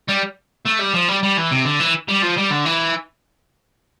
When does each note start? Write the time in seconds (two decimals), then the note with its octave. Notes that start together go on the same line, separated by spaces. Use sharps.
0.08 G3
0.66 A3
0.80 G3
0.94 F3
1.08 G3
1.23 G3
1.37 E3
1.51 C3
1.65 D3
1.80 E3
2.09 G3
2.22 F3
2.38 G3
2.51 D3
2.66 E3